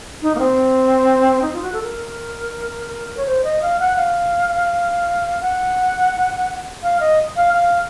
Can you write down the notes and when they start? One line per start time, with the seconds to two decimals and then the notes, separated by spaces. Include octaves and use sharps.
0.22 D#4
0.35 A#3
0.39 C4
1.42 D#4
1.53 F4
1.62 F#4
1.73 A4
1.83 A#4
3.17 C#5
3.26 C5
3.44 D#5
3.62 F5
3.79 F#5
3.97 F5
5.41 F#5
6.83 F5
7.00 D#5
7.36 F5
7.54 F5